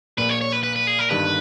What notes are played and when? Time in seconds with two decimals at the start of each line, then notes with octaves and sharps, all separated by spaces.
0.17 A#1 A#2 A#3 B4
0.29 C#5
0.41 C#5
0.52 B4
0.63 B4
0.76 B4
0.87 G#4
0.99 A#4
1.10 G1 G2 D#3 B4